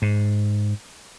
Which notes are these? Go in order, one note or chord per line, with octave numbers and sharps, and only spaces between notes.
G#2